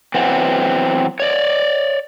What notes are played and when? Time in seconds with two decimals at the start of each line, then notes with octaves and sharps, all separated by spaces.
0.14 E3 F#3 B3 C4
1.20 C#5 D5